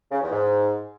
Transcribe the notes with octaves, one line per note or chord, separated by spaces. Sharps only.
C#3
E2
G#2